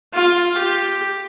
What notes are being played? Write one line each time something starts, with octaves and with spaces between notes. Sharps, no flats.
F4
G4